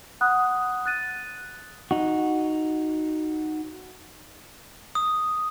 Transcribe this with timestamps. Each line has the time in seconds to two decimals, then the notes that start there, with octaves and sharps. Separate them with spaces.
0.21 F#5 B5 D#6 F#6
0.86 F#6 A6 D#7
1.91 D#4 F#4
4.95 D#6